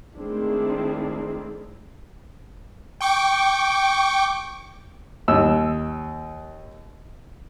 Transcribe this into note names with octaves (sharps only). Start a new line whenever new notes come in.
D#3 G#3 A3 C4 D4 E4
G5 C#6 D6
D#2 E6